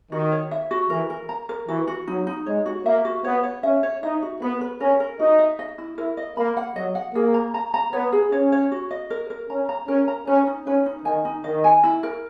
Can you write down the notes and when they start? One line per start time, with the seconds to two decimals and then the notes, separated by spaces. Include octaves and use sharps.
0.12 D#3 F#4
0.32 C#5
0.51 E5
0.71 F#4
0.90 E3 A#4
1.10 A#4
1.29 A#5
1.49 A#4
1.68 E3 F#4
1.87 F#4
2.07 F#3 D#4
2.27 D#4
2.46 G#3 C#5
2.66 F#4
2.86 A#3 E5
3.05 F#4
3.24 B3 C#5
3.43 C#5
3.63 C#4 E5
3.83 C#5
4.03 D#4 E5
4.22 F#4
4.42 B3 B4
4.61 B4
4.80 C#4 A#4
5.00 A#4
5.19 D#4 F#4
5.39 E5
5.59 D#5
5.78 E4
5.98 E4 A#4
6.17 D#5
6.37 A#3 B5
6.57 F#5
6.76 F#3 D#5
6.95 F#5
7.15 A#3 G#4
7.34 A#5
7.54 A#5
7.74 A#5
7.93 B3 C#5
8.12 G#4
8.32 C#4 C#5
8.52 C#5
8.72 F#4
8.91 D#5
9.10 A#4
9.30 A#4
9.49 C#4 A#5
9.69 A#5
9.88 C#4 A#4
10.08 A#5
10.27 C#4 B4
10.47 D#4
10.66 C#4 B4
10.86 D#4
11.05 D#3 G#5
11.25 D#4
11.44 D#3 D#5
11.64 G#5
11.84 E4
12.03 A#4